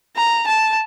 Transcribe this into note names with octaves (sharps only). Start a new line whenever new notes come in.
A#5
A5